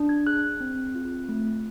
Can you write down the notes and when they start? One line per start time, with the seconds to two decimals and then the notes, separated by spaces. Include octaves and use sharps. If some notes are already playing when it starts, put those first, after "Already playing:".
Already playing: D4
0.09 G#6
0.26 G#4 F#6
0.60 C4
0.95 F4
1.29 A3